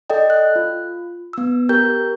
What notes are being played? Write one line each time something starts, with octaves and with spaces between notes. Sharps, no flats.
A4 D5 D#5 G5
F#6
F4
B3 E6
G4 A#4 G5 G6